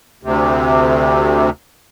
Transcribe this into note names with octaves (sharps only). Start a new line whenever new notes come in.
D2 C3